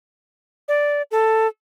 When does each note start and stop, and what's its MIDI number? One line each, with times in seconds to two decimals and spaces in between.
0.68 1.02 74
1.11 1.47 69